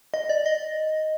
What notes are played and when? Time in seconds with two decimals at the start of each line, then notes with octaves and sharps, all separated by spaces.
0.14 D#5
0.29 D5
0.46 D#5